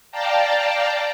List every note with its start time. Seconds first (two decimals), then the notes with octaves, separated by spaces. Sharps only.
0.12 D5 F5 G5 A5 A#5